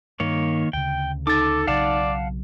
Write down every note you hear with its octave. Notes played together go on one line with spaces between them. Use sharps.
G2 D#3 A#3 C#5
D2 C#3 G5
D#4 A4 D6 A6
B1 C#3 F#3 D5 F5 F#5 A5